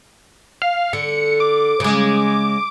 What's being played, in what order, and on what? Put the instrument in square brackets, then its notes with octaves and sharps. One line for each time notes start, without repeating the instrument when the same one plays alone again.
[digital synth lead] F5
[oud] D3 [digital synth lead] C#7
[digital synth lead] D6
[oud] C#3 G#3